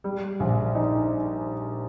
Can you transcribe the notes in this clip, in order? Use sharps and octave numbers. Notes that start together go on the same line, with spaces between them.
G3
A#1
D#4